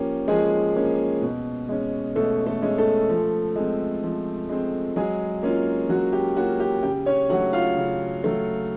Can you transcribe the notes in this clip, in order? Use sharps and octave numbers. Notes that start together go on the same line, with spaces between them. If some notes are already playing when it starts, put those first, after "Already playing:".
Already playing: F3 A#3 C#4 G4
F3 G#3 G#4
A#3 C#4
B2
G#3 C#4
B2 A3 A4
A3 A4
G#3 C#4
A3 A4
F3
G#3 C4
F3
G#3 C4
F#3 G#3 G#4
A#3 C#4 F4
F#3 F#4
G4
A#3 C#4 F4 F#4
G4
C#3 G4
C#4 C#5
F#3 A3 F#4 F#5
F4 F5
C#3
F#3 A3